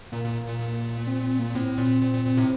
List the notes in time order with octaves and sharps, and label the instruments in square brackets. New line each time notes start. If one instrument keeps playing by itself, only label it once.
[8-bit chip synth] A#2 [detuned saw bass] A#3
[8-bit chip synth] A#2
A#2
A#2
[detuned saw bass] C4
C4
A#3
[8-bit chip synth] A2 [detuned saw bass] C4
[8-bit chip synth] A#2
A#2
A#2
A#2
A2 C3